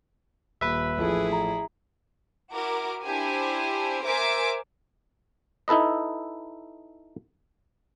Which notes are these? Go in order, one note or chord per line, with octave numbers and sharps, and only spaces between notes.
D#1 B4 E5
A1 F3 A3 E4 G#4
A#5
E4 F#4 A#4 D6
D4 E4 G4 C5 G#5
A#4 C5 E5 G#5 D6
D#4 E4 A4 B4 D#5